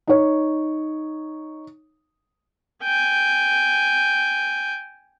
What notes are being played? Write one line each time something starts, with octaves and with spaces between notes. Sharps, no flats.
D#4 C#5
G5 G#5